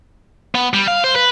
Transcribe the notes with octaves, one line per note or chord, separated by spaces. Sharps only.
B3
G3
F5
C5
B4